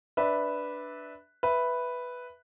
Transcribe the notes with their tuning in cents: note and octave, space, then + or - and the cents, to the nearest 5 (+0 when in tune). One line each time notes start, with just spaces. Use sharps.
D4 +0 B4 +0 E5 -15
B4 +0 E5 +0